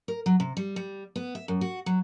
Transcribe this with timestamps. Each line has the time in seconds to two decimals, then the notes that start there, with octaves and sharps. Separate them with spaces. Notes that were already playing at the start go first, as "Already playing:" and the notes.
0.08 A#4
0.26 F#3
0.40 C3
0.57 G3
0.76 G3
1.16 B3
1.35 E5
1.48 F#2
1.61 F#4
1.86 F#3